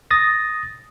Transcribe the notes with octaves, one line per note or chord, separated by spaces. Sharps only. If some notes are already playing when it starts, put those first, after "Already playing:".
D#6 A6 A#6